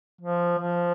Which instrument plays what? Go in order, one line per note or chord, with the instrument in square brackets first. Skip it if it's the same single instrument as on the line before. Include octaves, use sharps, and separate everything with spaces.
[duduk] F3
F3